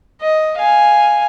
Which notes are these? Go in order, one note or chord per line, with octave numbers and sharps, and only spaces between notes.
D#5
F5 G#5